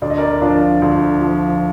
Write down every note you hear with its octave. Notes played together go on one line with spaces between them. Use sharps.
D2 D5
D#5
A#4 D5
F3 D4 F4
D2
F3